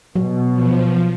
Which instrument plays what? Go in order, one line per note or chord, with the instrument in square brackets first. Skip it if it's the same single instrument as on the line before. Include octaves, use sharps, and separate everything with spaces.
[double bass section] B2 [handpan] F#3
[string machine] F3